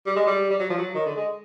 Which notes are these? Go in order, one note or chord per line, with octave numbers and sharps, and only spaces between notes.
G3
G#3
G3
G3
F#3
F3
F#3
D#3
D3
G#3